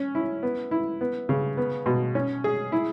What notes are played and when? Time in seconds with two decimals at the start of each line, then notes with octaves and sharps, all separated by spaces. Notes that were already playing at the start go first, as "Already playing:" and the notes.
Already playing: C#4
0.15 E4
0.43 B3
0.71 E4
1.01 B3
1.29 C#3
1.57 B3
1.86 B2
2.15 C#4
2.44 G#4
2.72 E4